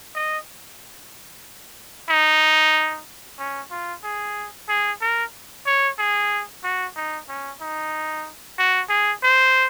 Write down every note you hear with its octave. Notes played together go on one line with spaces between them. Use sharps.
D#5
D#4
C#4
F4
G#4
G#4
A#4
C#5
G#4
F#4
D#4
C#4
D#4
F#4
G#4
C5